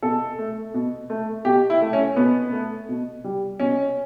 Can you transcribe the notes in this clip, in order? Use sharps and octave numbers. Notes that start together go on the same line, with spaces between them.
B2 A4
A3
B2
A3
B2 G4
E4
A3
C#4
B2 B3
A3
B2
G3
B2 C#4